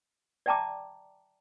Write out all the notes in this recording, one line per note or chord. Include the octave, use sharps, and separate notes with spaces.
D5 E5 G5 A5 A#5 D6